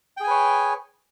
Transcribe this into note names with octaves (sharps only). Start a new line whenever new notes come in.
G#4 B4 C#5 G5 G#5